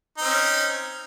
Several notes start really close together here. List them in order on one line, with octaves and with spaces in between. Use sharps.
D#4 C4 C#4